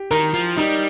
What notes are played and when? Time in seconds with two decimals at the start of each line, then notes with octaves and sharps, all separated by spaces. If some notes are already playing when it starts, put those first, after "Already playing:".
Already playing: G4
0.11 D#3 A#4
0.34 F3
0.57 G3 D#4